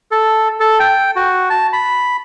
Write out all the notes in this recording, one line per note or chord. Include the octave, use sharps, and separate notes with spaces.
A4
A4
G5
F#4
A5
B5